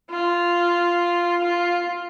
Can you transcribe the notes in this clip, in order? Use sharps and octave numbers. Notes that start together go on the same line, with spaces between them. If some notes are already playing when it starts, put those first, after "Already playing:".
F4
F4